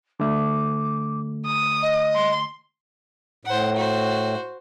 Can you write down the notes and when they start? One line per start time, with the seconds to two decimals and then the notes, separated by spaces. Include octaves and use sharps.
0.20 D3 A3 D6
1.46 D#6
1.82 D#5
2.16 C6
3.45 A2 C5 F#5
3.76 F#4 C5